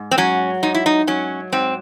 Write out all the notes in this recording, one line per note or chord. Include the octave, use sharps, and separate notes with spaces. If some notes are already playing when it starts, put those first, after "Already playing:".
Already playing: G#2
C4
F#3 C#4
G#2 D#4
E4
D#4
F#3 C#4
G#2 C4